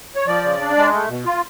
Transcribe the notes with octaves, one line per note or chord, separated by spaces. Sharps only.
C#5
F3 D5
C#3
D4
G#3
A3
B2
F4